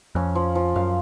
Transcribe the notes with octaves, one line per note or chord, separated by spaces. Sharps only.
F2 C#4
F3
F3
F#2 F5